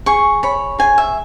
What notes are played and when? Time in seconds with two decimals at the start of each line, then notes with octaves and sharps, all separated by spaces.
0.06 G#4 C#6
0.43 C#5 B5
0.79 G#4 G#5
0.98 E5